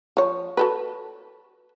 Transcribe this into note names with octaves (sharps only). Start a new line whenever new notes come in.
F3 C#5
F#4 A4 B4